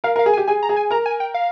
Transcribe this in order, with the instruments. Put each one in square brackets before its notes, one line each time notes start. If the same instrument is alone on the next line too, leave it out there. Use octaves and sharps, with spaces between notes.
[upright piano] A#4 [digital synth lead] F5
[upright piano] A#4 [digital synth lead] F5
[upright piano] G#4
[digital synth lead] G#5
[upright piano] G4
[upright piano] G#4 [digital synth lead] G#5
[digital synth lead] A#5
[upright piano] G#4
[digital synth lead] G#5
[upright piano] A#4 [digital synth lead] A#5
[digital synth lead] G#5
G5
F5